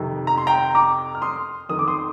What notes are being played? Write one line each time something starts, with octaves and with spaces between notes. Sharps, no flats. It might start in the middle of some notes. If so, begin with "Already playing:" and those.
Already playing: F2 C3 D#3
A#5
C6
G5 A#5
A#5 D6
F6
C6 D#6
F2 D#3 D#6
D6
C6 D#6